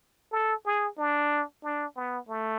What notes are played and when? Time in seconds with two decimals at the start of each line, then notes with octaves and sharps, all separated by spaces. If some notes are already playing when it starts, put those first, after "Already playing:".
0.32 A4
0.65 G#4
0.97 D4
1.63 D4
1.96 B3
2.29 A3